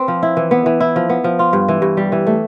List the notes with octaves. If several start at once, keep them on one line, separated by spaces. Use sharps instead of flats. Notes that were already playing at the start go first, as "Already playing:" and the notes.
Already playing: C4 B4
F3
E4
E3
B3
E3
E4
F3
B3
F3
F4
G2
E3
G2
G3
E3
A3